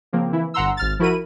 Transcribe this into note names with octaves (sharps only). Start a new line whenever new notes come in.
C#3 F3 A#3 C4
E3 E4
G1 G2 F#5 A#5 C6 E6
G#1 F6 A6
F3 E4 F#4 A#4 B5 D#7